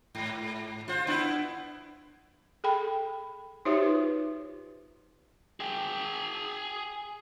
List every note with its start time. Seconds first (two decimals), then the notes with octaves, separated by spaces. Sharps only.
0.15 G#2
0.88 F4 C5
1.07 B3 D4 E4
2.64 G#4 A4 G5 B5
3.65 D#4 F#4 G4 C5 C#5 E5
3.82 F4 B4
5.60 G#4 G5